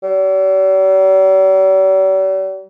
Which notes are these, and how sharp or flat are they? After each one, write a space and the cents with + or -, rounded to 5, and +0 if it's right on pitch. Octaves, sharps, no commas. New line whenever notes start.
G3 -45